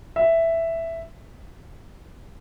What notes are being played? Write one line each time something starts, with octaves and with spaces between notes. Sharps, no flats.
E5